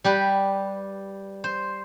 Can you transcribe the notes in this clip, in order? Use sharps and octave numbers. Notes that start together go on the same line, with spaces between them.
G3 G4 B4
C5